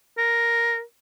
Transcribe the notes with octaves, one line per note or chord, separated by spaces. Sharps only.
A#4